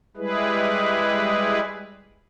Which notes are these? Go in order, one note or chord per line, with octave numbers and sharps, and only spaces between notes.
G3 G#3 E4 G#4 B4